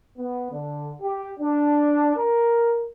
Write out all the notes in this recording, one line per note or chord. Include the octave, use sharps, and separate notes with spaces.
B3
D3
G4
D4
A#4